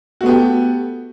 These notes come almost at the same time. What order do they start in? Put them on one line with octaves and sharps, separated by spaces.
F#4 A3 B3 G4